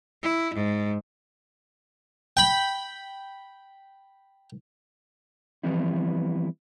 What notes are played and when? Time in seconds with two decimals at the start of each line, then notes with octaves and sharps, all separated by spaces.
0.23 E4
0.55 G#2
2.37 G5 B5
5.63 E3 F3 G3 B3 C4 E4